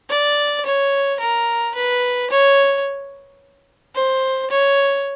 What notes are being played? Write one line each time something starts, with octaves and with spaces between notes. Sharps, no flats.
D5
C#5
A#4
B4
C#5
C5
C#5